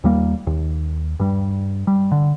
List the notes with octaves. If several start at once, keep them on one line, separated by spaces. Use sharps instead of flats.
D#2 G3 A#3
D#2
G2 G3
G3
D3